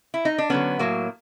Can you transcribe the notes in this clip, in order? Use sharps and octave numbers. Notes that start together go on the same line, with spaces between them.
E4
D#4
D4
D3 F#3 B3 C#4
A2 F#3 A#3